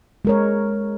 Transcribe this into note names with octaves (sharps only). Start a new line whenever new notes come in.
G#3 A#4 C#5